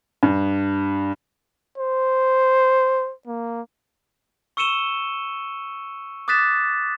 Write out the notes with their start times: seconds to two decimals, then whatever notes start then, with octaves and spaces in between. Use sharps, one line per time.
0.23 G2
1.78 C5
3.27 A#3
4.57 C#6 E6 C#7 D#7 E7 G7
6.28 D6 D#6 F#6 A6 B6 E7